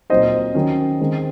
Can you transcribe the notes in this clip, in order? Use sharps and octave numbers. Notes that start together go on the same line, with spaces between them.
A#2 F#3 C4 D#4 C5 D#5
D#3 F#3 C#4
D#3 G#3 C4